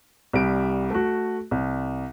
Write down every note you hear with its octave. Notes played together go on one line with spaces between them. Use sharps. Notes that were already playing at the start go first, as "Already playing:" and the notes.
C2 G3 D7
A3 F#4
C2